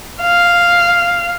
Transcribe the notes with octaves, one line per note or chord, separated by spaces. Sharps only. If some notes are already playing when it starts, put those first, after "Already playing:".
F5